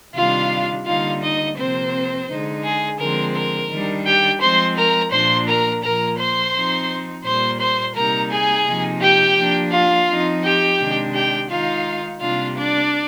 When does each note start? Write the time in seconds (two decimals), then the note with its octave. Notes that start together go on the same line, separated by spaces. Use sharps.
0.16 C3 D#3 G3 D4 F4 F5
0.87 D3 G3 A#3 D#4 F4 F5
1.22 D#4 D#5
1.58 C3 F3 A#3 C4 C5
2.29 D3 G#3 D#4
2.64 G#4
3.00 D3 F3 G#3 C4 A#4
3.35 A#4
3.71 D#3 G3 D4
4.06 G4 G5
4.41 F3 G#3 C4 C5 C6
4.77 A#4 A#5
5.12 A#2 F3 A#3 D4 C5 C6
5.48 A#4 A#5
5.83 A#2 F3 A#3 A#4 A#5
6.19 C5 C6
6.55 F3 C4 D#4
7.25 A#2 G3 A#3 C5 C6
7.61 C5 C6
7.96 C3 G3 A#3 D#4 A#4 A#5
8.31 G#4 G#5
8.67 C3 F3 A#3 D#4
9.02 G4 G5
9.38 F3 A#3 D4
9.73 F4 F5
10.09 F3 C4 D#4
10.44 G4 G5
10.80 C3 D#3 G#3 D4
11.15 G4 G5
11.50 D#3 G#3 D#4 F4 F5
12.21 C3 G3 A#3 D4 F4 F5
12.57 D4 D5